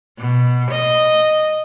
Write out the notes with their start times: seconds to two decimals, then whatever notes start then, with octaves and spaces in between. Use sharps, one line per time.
0.19 B2
0.71 D#5